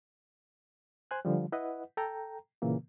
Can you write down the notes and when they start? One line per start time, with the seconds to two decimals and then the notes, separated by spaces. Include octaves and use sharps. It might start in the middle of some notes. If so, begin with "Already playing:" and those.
1.11 C5 G#5 F#6
1.25 D3 F3 G3
1.52 E4 B4 D#5 F#5
1.97 A4 G5 A#5
2.62 A#2 C#3 E3 A#3